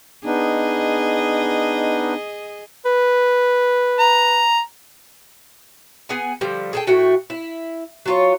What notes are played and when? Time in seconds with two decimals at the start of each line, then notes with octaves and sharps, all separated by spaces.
0.25 B3 D4 D#4 G#4 D#5
2.85 B4
3.99 A#5
6.09 B3 G#4 F#5 G#5
6.41 D3 F3 G3
6.73 G#4 A4 G5
6.87 A2 A3 F#4 G5
7.30 E4
8.06 F#3 F4 C#5